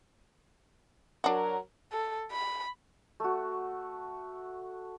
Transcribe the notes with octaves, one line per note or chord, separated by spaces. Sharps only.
F#3 D4 F#4 A#4
A4
B5
A3 F#4